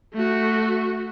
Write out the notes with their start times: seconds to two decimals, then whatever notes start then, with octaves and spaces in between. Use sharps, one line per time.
0.14 A3 F#4